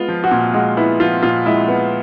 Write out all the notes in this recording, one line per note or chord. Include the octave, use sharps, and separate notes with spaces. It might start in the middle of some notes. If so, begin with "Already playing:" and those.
Already playing: G#3 B3 F4
F3
F#4
A#2
G#3 F#4
B3 E4
F3 F4
A#2 F4
G#3 E4
B3